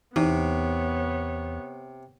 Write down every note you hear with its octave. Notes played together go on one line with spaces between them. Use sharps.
E2 C3 B3 D#4 C#5